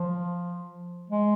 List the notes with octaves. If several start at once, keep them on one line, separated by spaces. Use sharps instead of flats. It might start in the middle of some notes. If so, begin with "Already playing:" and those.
Already playing: F3
G#3